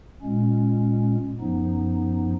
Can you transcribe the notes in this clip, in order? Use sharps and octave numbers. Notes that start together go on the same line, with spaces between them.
A#2 G#3 C#4
F#2 F3 B3 D#4